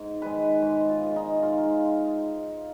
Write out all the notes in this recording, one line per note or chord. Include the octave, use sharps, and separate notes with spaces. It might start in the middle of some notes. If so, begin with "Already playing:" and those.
Already playing: G#2
D#3 G#3 B4
G#2 C5
F4
D#3 G#3
D#4
G#2 F4